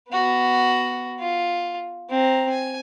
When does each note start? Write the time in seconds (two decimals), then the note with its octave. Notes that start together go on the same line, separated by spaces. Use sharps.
0.10 B3 F#4
1.20 F4
2.10 C4 A#5
2.50 G#5